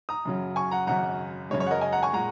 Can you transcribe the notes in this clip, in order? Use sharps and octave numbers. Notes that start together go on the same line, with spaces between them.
A#5 D#6
F#2 C#3 F#3
G#5 C#6
F#5 A#5
G#1 F#2 C#3 F#5 A#5
F#2 C#3 G#3 C#5
C#5
F#5
A#4 D#5
D#5 G#5
F#5 A#5
G#5 C#6
A#2 G#3 F#5 A#5